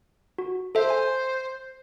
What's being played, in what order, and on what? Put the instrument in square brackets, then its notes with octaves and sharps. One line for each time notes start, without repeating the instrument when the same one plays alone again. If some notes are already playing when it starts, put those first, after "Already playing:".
[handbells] F#4
[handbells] A4 E5 [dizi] C5
[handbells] G#5